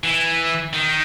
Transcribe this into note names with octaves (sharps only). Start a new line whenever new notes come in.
E3
D#3